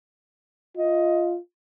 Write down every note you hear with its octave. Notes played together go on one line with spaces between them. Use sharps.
F4 D#5